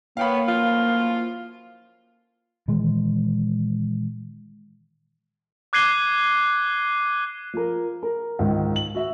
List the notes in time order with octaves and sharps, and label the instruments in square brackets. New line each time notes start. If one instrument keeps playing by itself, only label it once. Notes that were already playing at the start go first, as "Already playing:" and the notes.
[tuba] A#3 [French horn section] B3 C#5 [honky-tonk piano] F5 G5 B5
[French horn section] F#2 A2 F3 [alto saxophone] F4
[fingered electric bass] A#2 D#3 E3 G#3
[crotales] D6 F#6 G#6 C7 D#7 G7
[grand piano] F3 A#4
A#4
C#2 G#2 D#3
F#7
F#4 E5